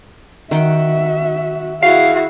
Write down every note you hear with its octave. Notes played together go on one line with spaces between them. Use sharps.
D#3 F#4 E5 F#5 G5
E4 F#4 G#4 F5